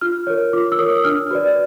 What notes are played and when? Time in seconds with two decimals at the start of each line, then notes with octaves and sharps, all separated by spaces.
0.01 F4 F6
0.27 A#4 C#5
0.53 F4 D6
0.72 E6
0.78 A#4 C#5 D#6
1.04 D4 F6
1.31 F#4 B4 D5